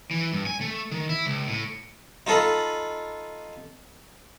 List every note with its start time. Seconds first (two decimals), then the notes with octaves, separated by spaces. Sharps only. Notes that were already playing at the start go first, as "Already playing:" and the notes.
0.11 E3
0.33 G2
0.46 G#5
0.61 A3
0.91 D#3
1.09 E4
1.26 C#2
1.47 A2
2.27 D#4 F4 A4 D#5 B5